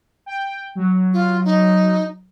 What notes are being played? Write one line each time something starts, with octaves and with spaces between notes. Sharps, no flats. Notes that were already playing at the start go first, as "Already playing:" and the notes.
G5
F#3
F4
D#4